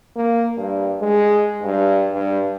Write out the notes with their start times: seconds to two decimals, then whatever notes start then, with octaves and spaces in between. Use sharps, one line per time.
0.16 A#3
0.58 G2
1.01 G#3
1.63 G2
2.13 G2